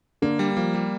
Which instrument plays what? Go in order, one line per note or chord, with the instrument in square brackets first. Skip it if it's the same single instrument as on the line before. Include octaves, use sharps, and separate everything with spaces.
[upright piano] D3 [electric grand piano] A#3
[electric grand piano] G3
[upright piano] F3 [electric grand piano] A#3
[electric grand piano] G3